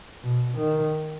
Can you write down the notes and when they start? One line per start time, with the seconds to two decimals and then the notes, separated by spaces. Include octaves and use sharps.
0.23 B2
0.58 D#3